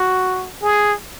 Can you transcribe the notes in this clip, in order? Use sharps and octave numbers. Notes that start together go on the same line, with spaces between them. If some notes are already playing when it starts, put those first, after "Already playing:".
Already playing: F#4
G#4